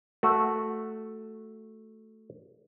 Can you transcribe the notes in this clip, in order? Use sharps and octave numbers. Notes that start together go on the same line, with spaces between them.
A3 F#4